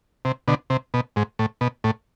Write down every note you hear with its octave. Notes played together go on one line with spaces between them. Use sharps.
C3
B2 D3
C3
B2
G#2
A2
B2
A2